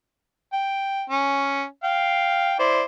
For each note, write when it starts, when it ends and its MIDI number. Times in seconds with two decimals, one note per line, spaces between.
0.53 1.04 79
1.10 1.64 61
1.84 2.54 77
1.84 2.54 79
2.59 2.83 64
2.59 2.83 72
2.59 2.83 74